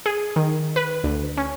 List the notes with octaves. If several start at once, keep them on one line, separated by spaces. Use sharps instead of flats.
G#4
D#3
B4
D2
C#4